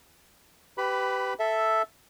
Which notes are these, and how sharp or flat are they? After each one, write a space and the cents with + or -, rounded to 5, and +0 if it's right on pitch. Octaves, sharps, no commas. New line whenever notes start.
G4 -15 B4 +20 B5 +0
A4 +0 E5 +0